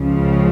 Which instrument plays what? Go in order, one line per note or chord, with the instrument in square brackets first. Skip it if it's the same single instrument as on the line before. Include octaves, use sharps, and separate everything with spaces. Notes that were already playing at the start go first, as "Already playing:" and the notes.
Already playing: [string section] C#2 C#3 F3